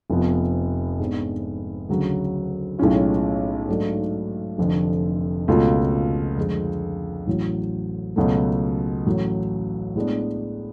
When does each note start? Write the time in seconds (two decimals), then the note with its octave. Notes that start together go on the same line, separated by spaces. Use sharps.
0.10 F1 F2 F3 B3
1.00 G#2 G#3 B3 D4
1.89 D2 C#3 F#3
2.79 B1 A2 G#3 C#4 F4
3.68 G#2 F#3 A3 D4
4.58 F1 F2 D3
5.48 C#2 B2 A3 F4
6.38 F2 D3 G#3
7.27 A1 A2 F#3
8.16 C#2 B2 F#3 A3
9.06 A1 A2 F#3
9.95 A2 G#3 B3 D4